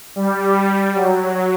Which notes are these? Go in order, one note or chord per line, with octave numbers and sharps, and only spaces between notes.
G3
F#3